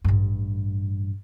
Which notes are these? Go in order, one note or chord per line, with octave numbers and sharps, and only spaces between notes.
A1 G2